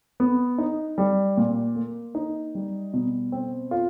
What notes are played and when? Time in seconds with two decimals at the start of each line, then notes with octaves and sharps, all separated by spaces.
0.20 B3
0.58 D#4
0.98 G3
1.37 A#2
1.76 A#3
2.15 D#4
2.55 G3
2.94 B2
3.32 C4
3.71 F4